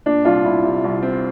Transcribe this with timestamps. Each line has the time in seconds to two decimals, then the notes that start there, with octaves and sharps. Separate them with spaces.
0.06 A#2 D4
0.25 C2 F4
0.45 C2 E4
0.64 C3
0.84 C2
1.03 C4